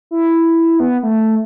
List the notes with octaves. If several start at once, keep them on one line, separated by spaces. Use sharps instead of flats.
E4
B3
A3